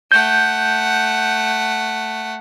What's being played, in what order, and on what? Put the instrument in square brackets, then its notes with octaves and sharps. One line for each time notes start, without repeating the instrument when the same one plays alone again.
[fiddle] A3 F#5 [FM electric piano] G6